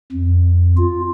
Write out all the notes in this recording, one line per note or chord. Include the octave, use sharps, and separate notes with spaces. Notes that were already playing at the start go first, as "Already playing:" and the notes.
F2
F4